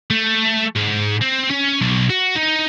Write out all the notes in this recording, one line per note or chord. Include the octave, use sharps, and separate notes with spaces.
A3
G#2
C4
C#4
B1
F#4
D#4